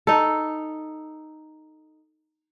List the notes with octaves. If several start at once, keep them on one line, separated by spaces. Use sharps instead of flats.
D#4 A4